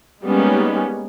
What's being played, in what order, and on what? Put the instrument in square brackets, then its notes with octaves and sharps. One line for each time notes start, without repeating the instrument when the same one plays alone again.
[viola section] G3 G#3 A#3 B3 C#4 D#4